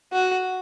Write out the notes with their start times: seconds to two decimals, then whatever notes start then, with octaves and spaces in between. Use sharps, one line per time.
0.13 F#4